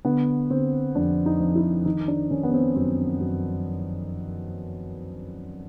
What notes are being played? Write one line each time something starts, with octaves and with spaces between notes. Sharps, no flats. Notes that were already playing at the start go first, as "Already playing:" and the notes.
D3 B3
D3 C4
F2 D4
D#4
F2
E4
D#3 D#4
D4
D#3 C#4
B3
C4
F#2 C4
F#2